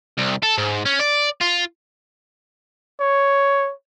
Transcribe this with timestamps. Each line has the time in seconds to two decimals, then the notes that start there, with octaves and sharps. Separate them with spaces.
0.18 C2
0.43 A4
0.58 G#2
0.86 C#4
1.00 D5
1.41 F4
3.00 C#5